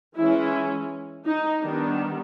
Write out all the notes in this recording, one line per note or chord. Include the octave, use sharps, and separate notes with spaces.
E3 G#3 C#4 E4
D#4
D#3 G3 B3 D4